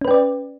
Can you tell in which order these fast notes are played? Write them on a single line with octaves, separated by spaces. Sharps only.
C#4 B4 G5 D5